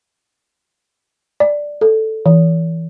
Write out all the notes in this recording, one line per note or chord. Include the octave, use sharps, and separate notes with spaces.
D5
A4
E3